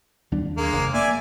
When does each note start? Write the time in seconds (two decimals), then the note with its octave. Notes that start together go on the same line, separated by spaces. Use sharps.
0.32 D#2 G3 D4
0.57 G#3 A#3
0.73 F1
0.94 A#3 D5 E5 G#5